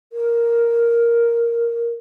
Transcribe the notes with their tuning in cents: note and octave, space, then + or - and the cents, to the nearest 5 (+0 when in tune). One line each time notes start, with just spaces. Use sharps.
A#4 +0